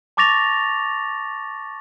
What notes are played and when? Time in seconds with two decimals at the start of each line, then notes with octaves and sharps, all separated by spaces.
0.17 A5 C#6 D6 A6 A#6 F7